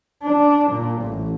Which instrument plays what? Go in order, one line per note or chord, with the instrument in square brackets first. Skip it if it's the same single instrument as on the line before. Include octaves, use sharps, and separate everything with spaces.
[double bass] D4
A#2
A1